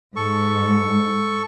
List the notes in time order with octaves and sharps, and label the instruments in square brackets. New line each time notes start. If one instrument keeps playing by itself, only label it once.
[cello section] G#2 [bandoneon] A4 C#6